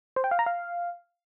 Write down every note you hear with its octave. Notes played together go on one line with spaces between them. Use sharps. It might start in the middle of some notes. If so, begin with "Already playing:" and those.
C5
G5
F5
A#5
F5